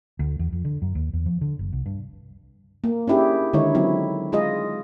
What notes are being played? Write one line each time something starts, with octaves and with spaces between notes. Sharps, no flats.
D2
E2
F2
D3
F#2
D#2
E2
F3
D3
F#1
C2
G2
A#3
C#4 D4 E4 G4 G#4
D3 D#3 G#3 D#4 E4 C#5
F#3 C4 E4
G#3 F4 G#4 D#5